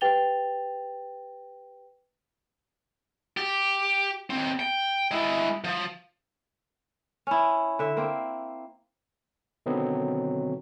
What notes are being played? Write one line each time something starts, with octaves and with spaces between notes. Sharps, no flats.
G4 B4 G5 A6 F7 G7
G4
D#2 C4
G5
G#3 E4
F3
C#4 E4
D3 E5
A#3 C4
B2 D3 D#3 F#3 B3 C4